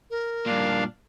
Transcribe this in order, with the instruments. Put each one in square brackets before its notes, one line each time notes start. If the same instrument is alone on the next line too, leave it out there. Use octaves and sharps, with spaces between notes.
[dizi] A#4
[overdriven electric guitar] G2 A#2 [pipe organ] D4 F5